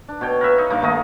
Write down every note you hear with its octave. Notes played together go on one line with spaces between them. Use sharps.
D4
B2 C#5 G5
A#4 B4 E5 F5
D#4
G2 A#3 D#4 D6
D#3 A3 A#3 D#5